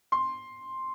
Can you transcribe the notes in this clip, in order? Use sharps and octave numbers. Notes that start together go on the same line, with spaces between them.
C6